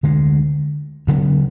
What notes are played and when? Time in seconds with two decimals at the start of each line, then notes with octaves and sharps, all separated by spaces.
0.03 D2 D3 G#3
1.07 D2 C#3 F#3 B3